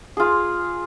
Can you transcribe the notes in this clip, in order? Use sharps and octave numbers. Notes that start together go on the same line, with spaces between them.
F4 G#4